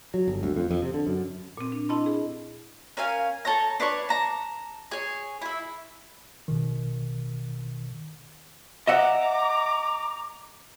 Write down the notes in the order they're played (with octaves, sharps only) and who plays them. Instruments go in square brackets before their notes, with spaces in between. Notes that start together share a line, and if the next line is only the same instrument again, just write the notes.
[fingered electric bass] F#3
G1
D2
F2
F2
C3
D3
F#2
[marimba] A#2 C4
D4
D4 E4 D#5 A5 B5 C6
G#4
[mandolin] C#4 A#4 F5 G#5
A4 C#5 A#5
D4 B4 C#5 C#6
A5 A#5
G#4 C#5
E4 E5
[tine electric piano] A#1 B2 D#3
[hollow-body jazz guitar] D#5 E5 F#5 [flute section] A#5 D6